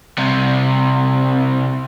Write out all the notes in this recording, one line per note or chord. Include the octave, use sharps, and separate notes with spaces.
C2 C3